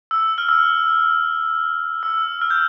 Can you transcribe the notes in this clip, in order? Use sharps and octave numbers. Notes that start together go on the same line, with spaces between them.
E6
F6
E6
E6
F6
G6